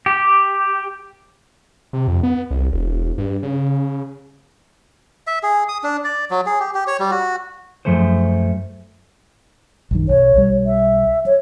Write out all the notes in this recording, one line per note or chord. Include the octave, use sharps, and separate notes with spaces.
G4
C3
F2
B3
C2
E1
G2
C#3
E5
G#4
D#6
D4
D5
F#3
G#4
G4
G4
C#5
G3
F#4
F#2 A#2 F3 A3 G#4 C5
A#1 F#2 D#3
B1 C#5
B1 G3
E5
C#5